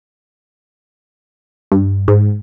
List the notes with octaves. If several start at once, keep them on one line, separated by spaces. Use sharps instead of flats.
G2
G#2